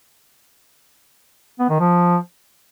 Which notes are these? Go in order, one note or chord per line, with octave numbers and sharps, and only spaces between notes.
B3
D#3
F3